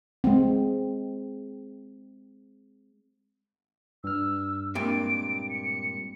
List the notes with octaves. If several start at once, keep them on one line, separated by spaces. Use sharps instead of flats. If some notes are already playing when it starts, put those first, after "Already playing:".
G#3 C4
G2 E6 F6
G2 A#2 G#3 C4 D7
C#7